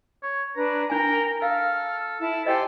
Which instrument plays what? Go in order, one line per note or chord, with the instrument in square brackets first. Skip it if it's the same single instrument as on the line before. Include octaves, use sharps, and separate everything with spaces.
[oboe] C#5
[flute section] D4 B4 [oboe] A#5
[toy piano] D4 G#5 [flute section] A#4 G5 [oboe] A#5
[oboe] A4 [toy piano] F5 [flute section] F6
[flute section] E4 A5
[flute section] G4 C5 G#5 [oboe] A4 [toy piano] D#5 G5